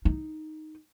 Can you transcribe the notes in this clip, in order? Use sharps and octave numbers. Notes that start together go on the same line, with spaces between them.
D#4